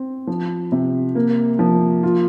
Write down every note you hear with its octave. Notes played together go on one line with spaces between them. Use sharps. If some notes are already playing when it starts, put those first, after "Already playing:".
Already playing: C4
F3
C3
A#3
F3
F4